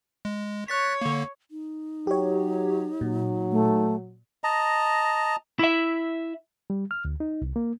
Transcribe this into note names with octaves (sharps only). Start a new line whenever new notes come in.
G#3
C#5 F#6 A6 B6
D3 A#3
D#4
F#3 G4 C#5
A#2 F#3
A3
D#5 A5 A#5
E4 E5
G3
F6
D2
D#4
C2
A#3